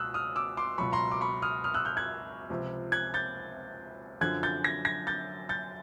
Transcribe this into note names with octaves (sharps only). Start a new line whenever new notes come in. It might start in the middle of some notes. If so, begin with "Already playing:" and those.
Already playing: C#2 B2 D#6 E6 F#6
D#6 F6
D6 E6
C6 D6
C#2 B2 F#3 B5 C#6
A#5 C6
D6
B5 C#6
D#6 F6
D#6 F6
E6 F#6
F6 G6
F#6 G#6
C#2 C3 F3
F#6 G#6
G6 A6
F#2 D3 F3 F#6 G#6
G6 A6
G#6 A#6
G#6 A#6
G6 A6
G6 A6